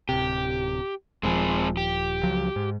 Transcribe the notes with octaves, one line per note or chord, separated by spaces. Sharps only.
D1 C3 G4
D#1 F3 G#3 C4 G#4
G4
C#2 F3 F#3
G#2